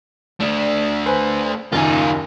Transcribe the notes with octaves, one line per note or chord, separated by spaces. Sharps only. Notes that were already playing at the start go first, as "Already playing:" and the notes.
A3 D4 D5
B4 C5 G#5
F#1 D#2 D#4 F4 G#5